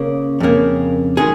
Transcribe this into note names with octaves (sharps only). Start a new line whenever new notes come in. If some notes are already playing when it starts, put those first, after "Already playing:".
Already playing: C#3 A#3
F2 C#3 A#3
D#3 G#3 G#4